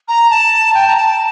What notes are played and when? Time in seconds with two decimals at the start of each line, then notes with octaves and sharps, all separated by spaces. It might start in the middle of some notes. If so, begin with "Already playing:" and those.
0.08 A#5
0.30 A5
0.74 G5
0.87 A#5
0.97 A5